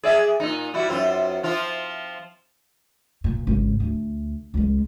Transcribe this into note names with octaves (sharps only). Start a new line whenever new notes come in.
G#4 D5 E5
A#2 C#3 D#4
G3 E4 F#4
F#2 C4 F4
F3 C4 F4
A#2
G#1 C#3
D2
C#2 G#3